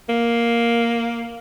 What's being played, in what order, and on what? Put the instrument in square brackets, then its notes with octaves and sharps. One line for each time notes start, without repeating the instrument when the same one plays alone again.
[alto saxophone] A#3